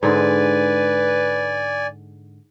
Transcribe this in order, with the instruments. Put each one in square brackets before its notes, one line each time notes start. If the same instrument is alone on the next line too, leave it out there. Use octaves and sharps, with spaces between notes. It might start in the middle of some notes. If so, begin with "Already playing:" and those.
[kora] G#2 D3 G#3 [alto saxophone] B4 [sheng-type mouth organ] D5 G#5